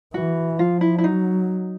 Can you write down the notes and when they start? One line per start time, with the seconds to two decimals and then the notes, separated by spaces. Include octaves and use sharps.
0.14 E3 F#4
0.59 F3 F4
0.81 E4
0.98 E4
1.04 F#3 D#4